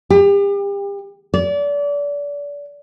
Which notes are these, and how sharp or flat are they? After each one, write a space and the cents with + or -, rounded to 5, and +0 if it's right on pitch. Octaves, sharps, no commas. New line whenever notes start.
G4 +35
D5 -30